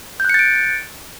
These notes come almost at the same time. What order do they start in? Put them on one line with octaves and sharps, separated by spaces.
G6 F#6 C#7 A6 D7